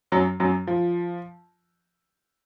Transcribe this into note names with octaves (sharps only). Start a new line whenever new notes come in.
F#2 F#3
F#2 F#3
F3